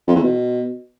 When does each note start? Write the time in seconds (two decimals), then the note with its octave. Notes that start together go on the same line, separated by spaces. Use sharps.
0.08 F2
0.16 E2
0.24 B2